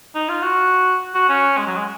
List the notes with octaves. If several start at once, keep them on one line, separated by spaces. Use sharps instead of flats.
D#4
F4
F#4
F#4
C#4
G#3
F#3
G#3